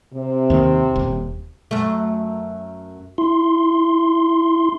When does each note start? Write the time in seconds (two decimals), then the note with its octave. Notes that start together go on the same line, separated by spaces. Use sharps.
0.14 C3
0.50 D#2 D#3
0.96 D#1
1.71 F#2 A3
3.18 E4 C6